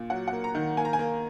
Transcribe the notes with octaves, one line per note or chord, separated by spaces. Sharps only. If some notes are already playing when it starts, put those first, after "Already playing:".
Already playing: A#2
F#3 F#5
F#5
A#3
A#5
D#3
A#3 G#5
A#5
G#5
A#3